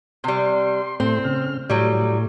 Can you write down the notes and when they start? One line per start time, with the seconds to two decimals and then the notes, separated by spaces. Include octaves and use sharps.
0.24 C3 G3 C6
1.00 A2 A3 C4 C6
1.24 C#3 F6
1.69 A2 F#3 G3